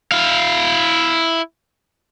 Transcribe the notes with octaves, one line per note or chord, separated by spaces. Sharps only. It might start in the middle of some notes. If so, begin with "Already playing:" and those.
E4 F5